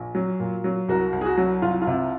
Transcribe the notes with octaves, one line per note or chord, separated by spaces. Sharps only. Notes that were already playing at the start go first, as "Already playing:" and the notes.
Already playing: A#1
F#3
A#2
F#3
C2 F#4 A#4
C2
G#4
F#4
F#3
C2 F4
F4
C3